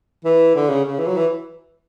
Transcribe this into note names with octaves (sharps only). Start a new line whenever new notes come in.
E3
D3
C#3
C#3
E3
F#3
E3